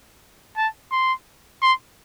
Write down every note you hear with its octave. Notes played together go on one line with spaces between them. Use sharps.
A5
C6
C6